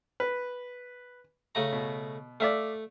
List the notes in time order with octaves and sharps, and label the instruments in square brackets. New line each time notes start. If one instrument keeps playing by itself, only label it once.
[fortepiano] B4
[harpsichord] C#3 A3 A#5
[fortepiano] B2
[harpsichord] A3 [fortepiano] D5 E5 F5